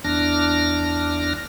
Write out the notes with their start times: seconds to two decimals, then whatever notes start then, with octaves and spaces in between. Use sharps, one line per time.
0.04 E2 D4 F6 A#6